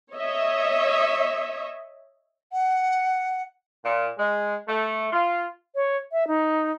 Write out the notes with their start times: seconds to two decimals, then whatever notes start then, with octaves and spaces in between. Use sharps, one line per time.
0.14 C#5 D#5 E5
2.52 F#5
3.82 A#2
4.18 G#3
4.68 A3
5.11 F4
5.74 C#5
6.12 E5
6.28 D#4